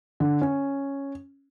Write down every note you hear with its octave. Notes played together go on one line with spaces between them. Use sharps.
D3
C#4